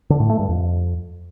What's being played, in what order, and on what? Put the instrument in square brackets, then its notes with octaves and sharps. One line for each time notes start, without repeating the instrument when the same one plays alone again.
[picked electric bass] D3
A2
A3
G2
F2